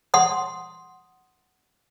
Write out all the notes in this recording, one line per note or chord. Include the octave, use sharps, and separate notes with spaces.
F#5 C6 D#6